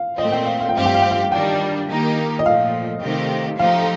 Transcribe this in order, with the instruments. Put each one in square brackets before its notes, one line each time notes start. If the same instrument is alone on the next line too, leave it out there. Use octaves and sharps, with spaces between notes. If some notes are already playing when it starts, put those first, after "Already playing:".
Already playing: [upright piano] F5
[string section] A#2 A3 C4 [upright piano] D#5
[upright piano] G5
F5
F5
G5
[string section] G2 F3 A3 C4 G4 [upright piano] F5
[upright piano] G5
F5
G5
F5
[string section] D#3 G3 D4 [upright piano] G5
[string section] D#3 A#3 D#4 G4
[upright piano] D#5
[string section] A#2 F3 A3 [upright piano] F5
[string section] C3 D#3 A3 C4 G4
[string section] F3 A3 D#4 G4 [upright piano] F5